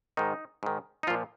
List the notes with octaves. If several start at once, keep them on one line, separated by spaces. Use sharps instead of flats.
G#2 D#3 D#4
G#2 D#3
D#4
A#2 F3 F4